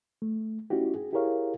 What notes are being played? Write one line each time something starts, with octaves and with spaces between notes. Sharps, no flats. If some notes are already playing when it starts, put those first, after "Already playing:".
A3
C#4 D#4 E4 F#4 G4
G#4
E4 G4 G#4 A#4 C#5 F5